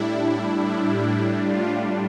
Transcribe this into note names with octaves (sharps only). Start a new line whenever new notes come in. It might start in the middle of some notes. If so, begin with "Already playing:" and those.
Already playing: A2 G3 D4 E4
A2 G3 D4
F4